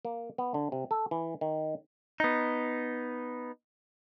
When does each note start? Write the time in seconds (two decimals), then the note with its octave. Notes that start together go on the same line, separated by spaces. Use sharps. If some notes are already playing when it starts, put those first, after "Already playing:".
0.05 A#3
0.38 B3
0.54 D3
0.72 C3
0.91 A4
1.11 E3
1.41 D#3
2.20 B3 D#4